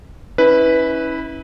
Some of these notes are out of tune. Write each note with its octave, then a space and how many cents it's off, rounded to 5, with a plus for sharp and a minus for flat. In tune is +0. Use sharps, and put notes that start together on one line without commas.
C#4 +0 E4 -30 B4 +0